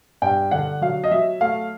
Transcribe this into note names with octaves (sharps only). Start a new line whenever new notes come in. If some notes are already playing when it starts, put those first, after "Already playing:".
G2 G5
D3 F#5
F#3 F5
D#5
F#3 E5
A3 F5